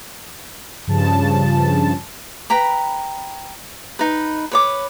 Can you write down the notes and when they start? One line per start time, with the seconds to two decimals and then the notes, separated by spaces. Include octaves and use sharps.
0.87 G2 C#3 F3 A5
2.50 B4 G5 A#5 B5
3.99 D#4 B4
4.51 B4 C#5 D6